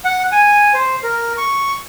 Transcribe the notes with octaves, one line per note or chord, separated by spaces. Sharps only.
F#5
G#5
C5
A#4
C#6